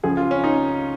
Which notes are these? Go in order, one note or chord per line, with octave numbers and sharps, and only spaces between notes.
C#2 C#3 F3 G#4
F4
C#4
D#4